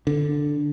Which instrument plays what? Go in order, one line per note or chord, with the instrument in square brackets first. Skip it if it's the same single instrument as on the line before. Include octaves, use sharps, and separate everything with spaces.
[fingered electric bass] D3